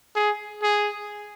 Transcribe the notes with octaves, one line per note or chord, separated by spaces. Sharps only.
G#4
G#4